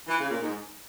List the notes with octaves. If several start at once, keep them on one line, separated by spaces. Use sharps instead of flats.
E3
C#3
A#2
G#2